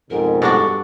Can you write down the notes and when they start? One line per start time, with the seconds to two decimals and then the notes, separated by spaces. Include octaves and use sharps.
0.10 F2 G#2 B2 A#4
0.42 G2 D4 F#4 A4